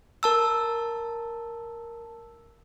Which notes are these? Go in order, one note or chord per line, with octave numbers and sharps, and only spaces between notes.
A#4 A5 E6